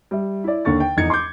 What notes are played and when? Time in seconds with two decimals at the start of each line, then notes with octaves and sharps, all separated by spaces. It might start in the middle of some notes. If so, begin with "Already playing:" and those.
0.11 G3 E5
0.44 E4 D5
0.65 D#2 D3 C#6 A6
0.80 G5
0.97 F1 E2 D#4 G#6 C#7
1.10 C6 D6 G6